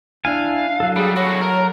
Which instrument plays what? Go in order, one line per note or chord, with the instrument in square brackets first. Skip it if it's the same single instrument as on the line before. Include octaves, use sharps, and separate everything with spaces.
[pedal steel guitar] D4 E4 G#5 [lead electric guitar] F5
[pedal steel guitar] F#3 A4
[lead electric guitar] G3 [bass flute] G#4
[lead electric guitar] A2 F#4 [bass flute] C#5
[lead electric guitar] A#4